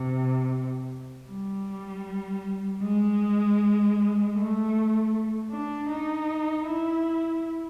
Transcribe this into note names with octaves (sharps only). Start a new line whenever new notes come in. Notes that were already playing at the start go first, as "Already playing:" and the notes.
Already playing: C3
G3
G#3
A3
D4
D#4
E4